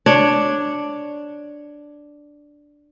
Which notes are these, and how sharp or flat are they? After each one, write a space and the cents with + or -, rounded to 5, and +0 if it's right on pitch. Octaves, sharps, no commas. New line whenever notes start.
D4 +0 C#5 +0